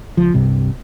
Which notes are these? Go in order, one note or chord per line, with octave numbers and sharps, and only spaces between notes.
C#2 F3
C2 G2 C3